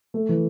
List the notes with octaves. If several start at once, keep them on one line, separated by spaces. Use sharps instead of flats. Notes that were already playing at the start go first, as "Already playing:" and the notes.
A3
E3